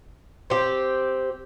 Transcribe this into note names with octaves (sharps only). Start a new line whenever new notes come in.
C4 G4